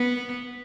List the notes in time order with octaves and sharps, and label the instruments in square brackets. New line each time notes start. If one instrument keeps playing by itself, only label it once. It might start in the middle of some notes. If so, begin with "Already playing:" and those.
Already playing: [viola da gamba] B3